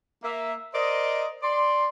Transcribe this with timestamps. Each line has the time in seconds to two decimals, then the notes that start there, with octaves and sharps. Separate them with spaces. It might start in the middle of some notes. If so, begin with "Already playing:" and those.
0.24 A#3 E5
0.74 A#4 C5 D5 D#5
1.43 D5 C6